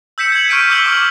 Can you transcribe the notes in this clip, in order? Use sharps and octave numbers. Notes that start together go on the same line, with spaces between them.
E6 G6 B6 C#7 E7
G#6 C#7 F#7
C#6 F6 G6 B6 D7 D#7
D6 E6 G6 C#7 F#7 G7
C#6 D6 F6 F#7